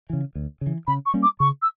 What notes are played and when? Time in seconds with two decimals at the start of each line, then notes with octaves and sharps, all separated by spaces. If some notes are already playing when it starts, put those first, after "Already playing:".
0.10 C#3 E3
0.35 D2
0.61 C#3
0.67 E3
0.87 C#3 B5
1.06 C#6
1.14 G3 A#3 C#4
1.23 D6
1.40 C#3 C#6
1.62 E6